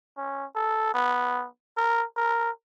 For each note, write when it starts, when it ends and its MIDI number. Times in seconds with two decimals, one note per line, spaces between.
0.17 0.45 61
0.55 0.92 69
0.94 1.46 59
1.77 2.04 70
2.17 2.50 70